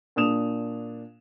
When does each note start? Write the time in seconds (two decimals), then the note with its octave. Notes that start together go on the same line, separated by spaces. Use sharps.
0.16 A#2 D4 D#6 E7 F7